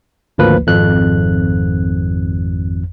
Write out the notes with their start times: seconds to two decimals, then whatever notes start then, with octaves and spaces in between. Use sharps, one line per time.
0.38 G#1 D2 F3 A#3 B4
0.66 G#1 F2 F#6